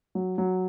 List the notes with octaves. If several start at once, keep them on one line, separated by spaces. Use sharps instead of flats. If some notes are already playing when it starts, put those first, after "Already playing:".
F#3
F#3